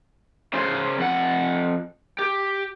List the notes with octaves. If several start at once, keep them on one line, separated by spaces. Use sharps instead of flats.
C#3 C5
F2 F#5
G4